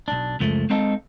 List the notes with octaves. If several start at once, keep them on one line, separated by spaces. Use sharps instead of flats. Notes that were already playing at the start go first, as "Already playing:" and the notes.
B1 D4
C#2 F#2 F3 A3 A#3
G#3 C4 D#4 A4 D#5 F5